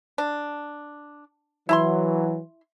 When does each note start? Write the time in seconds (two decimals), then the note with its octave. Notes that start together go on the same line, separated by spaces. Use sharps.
0.18 D4
1.69 E3 F#3 E4 A#5 C6